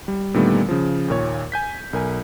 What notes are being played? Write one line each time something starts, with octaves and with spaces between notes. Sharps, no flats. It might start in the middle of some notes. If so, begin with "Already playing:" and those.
G3
A#2 D3 D#3 G3 A3 B3
C#3 F3
D#2 A#2 C#5
G#5 G6 B6
B1 A#4 G#5